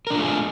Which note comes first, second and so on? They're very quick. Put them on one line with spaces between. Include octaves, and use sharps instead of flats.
A#4 D4 F4 A3 G#4